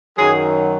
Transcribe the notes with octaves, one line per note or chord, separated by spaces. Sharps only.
F#2 D#3 F#3 G#4